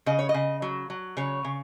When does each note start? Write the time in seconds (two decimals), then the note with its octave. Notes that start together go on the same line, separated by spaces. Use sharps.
0.06 C#3 D#5
0.19 C#5
0.29 D#5
0.34 C#3
0.62 F#3
0.90 F#3
1.17 C#3 C#5
1.45 C#3